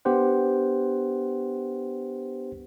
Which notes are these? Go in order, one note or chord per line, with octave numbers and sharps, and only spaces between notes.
B3 D4 G4 C5 F#5